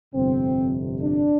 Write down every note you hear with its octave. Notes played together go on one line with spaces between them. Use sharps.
G1 F2 C3 C4
D4